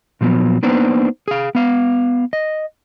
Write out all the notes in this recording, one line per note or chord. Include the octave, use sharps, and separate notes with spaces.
A#2 F3 F#3 B3
A#3 B3 D4 D#4 B4 C5
G#4 F5
B3 F5
D#5